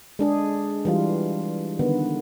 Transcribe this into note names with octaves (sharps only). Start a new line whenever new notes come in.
G#3 D4 G#4
E3 G3 F4
D3 D#3 B3